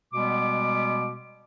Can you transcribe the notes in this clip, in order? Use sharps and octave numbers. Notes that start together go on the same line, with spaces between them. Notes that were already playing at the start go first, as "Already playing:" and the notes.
B2 G3 G#3 B3 D6